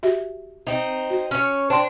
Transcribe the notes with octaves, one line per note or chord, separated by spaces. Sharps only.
F#4 G4 E5
C4 D#4
F#4
C#4 C#5
D4 C5 G5 C6